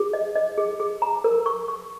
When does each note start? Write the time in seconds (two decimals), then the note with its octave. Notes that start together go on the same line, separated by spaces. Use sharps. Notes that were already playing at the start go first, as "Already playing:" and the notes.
Already playing: G#4
0.13 D#5
0.35 D#5
0.58 G#4
0.80 G#4
1.02 A#5
1.24 A#4
1.46 C#6
1.68 C#6